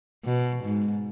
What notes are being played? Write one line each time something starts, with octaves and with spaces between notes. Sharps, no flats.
B2
G#2